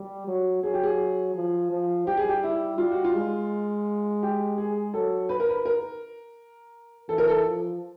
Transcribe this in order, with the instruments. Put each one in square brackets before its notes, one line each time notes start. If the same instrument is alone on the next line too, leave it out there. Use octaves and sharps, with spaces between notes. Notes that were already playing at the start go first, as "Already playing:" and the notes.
Already playing: [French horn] G3
F#3
[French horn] F#3 [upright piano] G#4
[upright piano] G4
G#4
[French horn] F3
F3
[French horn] G3 [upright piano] G4
[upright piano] G#4
G4
E4
[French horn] G3 [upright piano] F4
[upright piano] F#4
F4
[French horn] G#3
[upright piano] G4
G#4
[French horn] F#3 [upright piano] A4
[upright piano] B4
A#4
B4
A#4
[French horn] E3 [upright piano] A4
[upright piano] A#4
A4
[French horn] F3